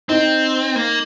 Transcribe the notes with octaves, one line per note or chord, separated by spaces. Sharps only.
C4 D#4
A#3